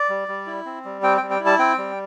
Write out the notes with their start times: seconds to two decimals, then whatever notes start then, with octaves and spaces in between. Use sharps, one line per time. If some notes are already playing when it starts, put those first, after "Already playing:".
Already playing: D5
0.09 G3
0.28 G3
0.47 E4
0.65 C4
0.85 G3
1.03 C4 G5
1.17 G5
1.22 G3
1.31 G5
1.40 E4
1.46 A5
1.59 C4 G5
1.78 G3